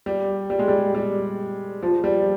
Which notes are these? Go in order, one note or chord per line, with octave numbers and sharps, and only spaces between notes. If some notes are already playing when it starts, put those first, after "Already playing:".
G3
G3
G#3
G3
G3
F3
G3